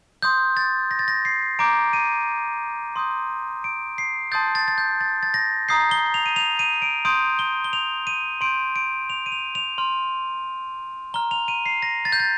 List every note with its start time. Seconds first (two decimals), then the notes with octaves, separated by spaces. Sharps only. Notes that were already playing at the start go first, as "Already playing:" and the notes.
0.22 C6 D#6 G6
0.57 A6
0.91 A#6
0.99 A6
1.08 A#6
1.25 C7
1.59 A#5 D6 G6 D7
1.93 D#7
2.96 C6 D#6 G6
3.64 D7
3.98 C7
4.32 A5 C6 D#6 G6 A6
4.55 A6
4.68 A6
4.78 G6
5.01 A6
5.23 A6
5.34 A#6
5.69 A#5 D#6 G6 C7
5.91 G7
6.14 F7
6.26 D#7
6.36 F7
6.59 D#7
6.82 D7
7.05 C6 D#6 G6 D7
7.39 G7
7.64 G7
7.73 F7
8.07 D#7
8.41 C6 G6 D7
8.76 D7
9.10 F7
9.26 D#7
9.32 F7
9.55 F7
9.78 C6 F6
11.14 A#5 F6 G7
11.31 F7
11.48 D#7
11.66 C7
11.82 A#6
12.05 A6
12.12 G6
12.20 A6